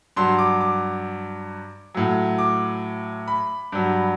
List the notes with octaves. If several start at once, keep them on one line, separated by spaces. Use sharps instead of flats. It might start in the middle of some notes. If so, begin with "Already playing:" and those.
G2 F#3 C6
D6
D6
A2 F#3
D6
B5
G2 F#3